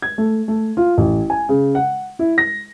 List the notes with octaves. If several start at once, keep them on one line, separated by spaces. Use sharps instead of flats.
G#6
A3
A3
F4
A1
G#5
C#3
F#5
E4
A#6